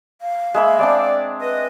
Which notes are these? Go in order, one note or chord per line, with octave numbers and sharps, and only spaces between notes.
F5
G#3 A#3 E5 B5
G#3 C4 D4 D5 D6
B4 D#5